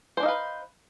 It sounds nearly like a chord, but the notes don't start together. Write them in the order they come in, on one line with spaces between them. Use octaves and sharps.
C5 D4 D#4 F5 B4